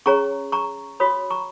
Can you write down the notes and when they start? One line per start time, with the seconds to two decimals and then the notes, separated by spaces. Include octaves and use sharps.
0.06 C#4 G#4 C#5 A#5 C#6
0.52 A#5 C#6
1.00 F#4 C#5 B5 D#6
1.30 A#5 C#6